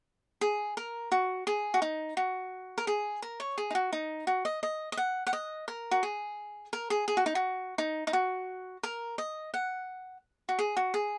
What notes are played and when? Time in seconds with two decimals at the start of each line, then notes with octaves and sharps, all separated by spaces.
0.41 G#4
0.77 A#4
1.12 F#4
1.47 G#4
1.74 F#4
1.82 D#4
2.17 F#4
2.78 A#4
2.87 G#4
3.22 A#4
3.40 C#5
3.58 G#4
3.71 D#4
3.75 F#4
3.93 D#4
4.27 F#4
4.45 D#5
4.63 D#5
4.92 D#5
4.97 F#5
5.27 F#5
5.33 D#5
5.68 A#4
5.91 F#4
6.03 G#4
6.73 A#4
6.90 G#4
7.08 G#4
7.17 F#4
7.26 D#4
7.35 F#4
7.78 D#4
8.07 D#4
8.13 F#4
8.83 A#4
9.18 D#5
9.54 F#5
10.49 F#4
10.59 G#4
10.77 F#4
10.94 G#4